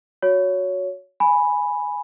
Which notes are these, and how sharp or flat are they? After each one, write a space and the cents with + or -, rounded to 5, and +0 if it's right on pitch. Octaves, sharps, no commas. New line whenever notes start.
F#4 -10 C#5 +15
G#5 +0 B5 +0